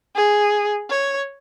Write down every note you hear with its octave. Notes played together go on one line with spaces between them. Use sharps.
G#4
C#5